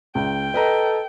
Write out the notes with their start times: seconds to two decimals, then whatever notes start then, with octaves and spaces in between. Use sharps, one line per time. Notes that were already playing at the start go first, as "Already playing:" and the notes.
0.15 C#2 G5
0.54 A4 B4 D#5 A#5